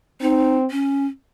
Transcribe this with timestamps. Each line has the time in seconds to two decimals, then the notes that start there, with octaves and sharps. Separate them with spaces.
0.21 C4 D#4
0.71 C#4